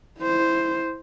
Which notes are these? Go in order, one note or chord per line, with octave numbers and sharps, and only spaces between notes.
E4 C5